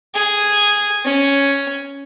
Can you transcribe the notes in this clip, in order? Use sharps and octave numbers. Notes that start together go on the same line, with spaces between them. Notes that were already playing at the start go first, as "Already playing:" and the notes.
G#4
C#4